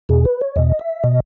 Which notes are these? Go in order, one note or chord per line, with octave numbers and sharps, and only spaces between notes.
E2 B2 G#4
B4
C#5
E2 B2 D#5
E5
B2 D#5